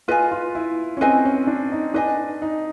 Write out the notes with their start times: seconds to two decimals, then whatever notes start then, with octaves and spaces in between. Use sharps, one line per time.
0.08 F4 B4 D#5 G#5
0.31 F4
0.55 E4
0.97 C#4
1.01 C4 B4 D#5 G#5
1.25 C#4
1.47 D4
1.72 D#4
1.94 D4 B4 D#5 G#5
2.42 D#4